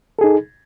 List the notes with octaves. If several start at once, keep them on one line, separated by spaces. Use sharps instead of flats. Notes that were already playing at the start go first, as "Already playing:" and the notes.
D#4 G#4 A4